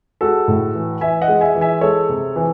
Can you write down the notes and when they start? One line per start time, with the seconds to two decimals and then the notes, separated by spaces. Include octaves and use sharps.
0.21 G#3 F#4 A4
0.48 A2
0.75 E3
1.01 E3 E5 G#5
1.22 D#5 F#5
1.28 G#3
1.41 E5 G#5
1.55 E3
1.61 E5 G#5
1.81 G#3 A4 C#5
2.09 C3
2.36 E3